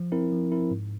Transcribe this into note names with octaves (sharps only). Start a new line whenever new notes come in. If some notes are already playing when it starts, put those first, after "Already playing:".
Already playing: F3
C4 E4 A#4
F3
C4 E4 A#4
G#2